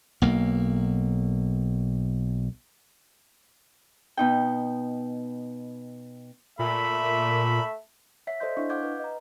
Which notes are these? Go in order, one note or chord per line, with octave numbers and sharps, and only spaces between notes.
B1 A#3
B2 D#4 G5
A#2 A3 E5 B5
C#5 E5 F#5 B6 C7
A4 C5 D5 D#5 C6 G6
D4 E4 D#5 F5 C#6
F5 F#5 D6 G6 G#6
B4
D#5 A#5